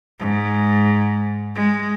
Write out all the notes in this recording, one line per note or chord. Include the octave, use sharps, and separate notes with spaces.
G#2
G#3